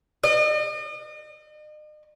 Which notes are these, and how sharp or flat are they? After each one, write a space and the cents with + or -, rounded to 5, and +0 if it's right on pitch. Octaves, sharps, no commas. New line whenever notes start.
D#5 -40